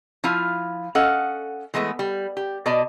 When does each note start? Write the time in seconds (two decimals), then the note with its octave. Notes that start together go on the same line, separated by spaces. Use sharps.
0.24 F3 E4 F4 F5
0.95 C#4 A4 D#5 F5 F#5
1.74 E3 G#3 A3 B3
1.99 G3
2.37 G4
2.66 B2 D5 D#5 A5